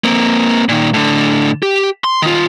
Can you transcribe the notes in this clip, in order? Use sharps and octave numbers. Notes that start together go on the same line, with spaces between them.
A#3 C4
A#2 D#3
A2 D3
G4
C6
D#3 F4